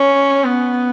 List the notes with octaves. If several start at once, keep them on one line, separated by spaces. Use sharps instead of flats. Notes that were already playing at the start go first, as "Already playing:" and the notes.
Already playing: C#4
B3